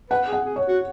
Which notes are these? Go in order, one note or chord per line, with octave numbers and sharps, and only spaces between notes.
B4 F#5
G#4
F#5
G#4
C#5
F#4